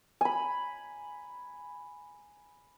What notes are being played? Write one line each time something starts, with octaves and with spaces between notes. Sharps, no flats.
G#5 B5